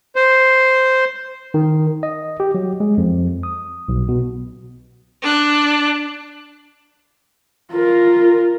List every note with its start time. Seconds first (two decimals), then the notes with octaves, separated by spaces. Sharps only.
0.16 C5
1.54 D#3
2.03 D#5
2.40 G4
2.54 F#3
2.80 G#3
2.98 F2
3.43 D#6
3.89 B1
4.08 B2
5.22 D4 F#6
7.73 F4 A#4